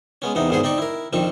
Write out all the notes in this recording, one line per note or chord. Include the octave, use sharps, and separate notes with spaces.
G#3 B3 C#4
E2 C3 B3 D#4
C2 G#2 D#3 B3 G#4 C5
C4 D#4 D5 C#6
E4 A#4
A#1 F2 D#3 C4 C#6